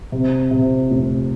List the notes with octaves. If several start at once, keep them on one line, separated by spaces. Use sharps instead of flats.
C3
C3
F1